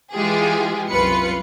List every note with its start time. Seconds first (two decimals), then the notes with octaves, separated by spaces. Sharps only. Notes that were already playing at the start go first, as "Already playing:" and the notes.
0.12 E3 G#3 F4 G4 G#4
0.90 C2 F#2 F4 B4 C#7